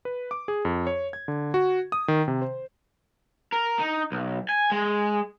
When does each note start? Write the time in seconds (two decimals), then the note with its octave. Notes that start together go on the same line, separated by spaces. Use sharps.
0.05 B4
0.31 D6
0.48 G#4
0.65 F2
0.87 C#5
1.13 G#6
1.28 D3
1.54 F#4
1.92 D#6
2.08 D#3
2.28 C3
2.42 C5
3.52 A#4
3.79 D#4
4.12 B1
4.49 G#5
4.72 G#3